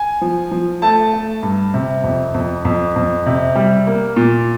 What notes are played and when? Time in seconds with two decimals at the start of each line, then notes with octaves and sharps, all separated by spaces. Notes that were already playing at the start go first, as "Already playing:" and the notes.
Already playing: G#5
0.21 F3
0.51 F3
0.82 A3 A5
1.13 A3
1.43 G2
1.74 C3
2.04 F2
2.34 F2
2.65 F2
2.96 F2
3.26 C3
3.56 G3
3.87 A#3
4.16 A#2